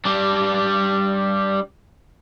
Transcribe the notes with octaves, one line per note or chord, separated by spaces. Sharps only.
G3 D4